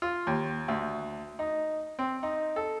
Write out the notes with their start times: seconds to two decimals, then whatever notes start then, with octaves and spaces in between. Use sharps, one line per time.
0.02 F4
0.27 D#2
0.68 D2
1.39 D#4
1.99 C4
2.23 D#4
2.56 A4